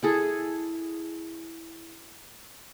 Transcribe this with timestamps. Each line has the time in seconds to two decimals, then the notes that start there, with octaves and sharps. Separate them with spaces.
0.03 E4 G#4 A4